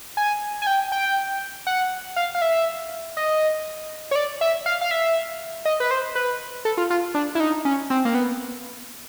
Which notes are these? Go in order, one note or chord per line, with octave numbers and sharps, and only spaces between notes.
G#5
G#5
G5
G5
F#5
F5
F5
E5
D#5
C#5
D5
E5
F5
F5
E5
D#5
B4
C5
B4
A4
F4
F4
D4
E4
D#4
C#4
C4
A#3
B3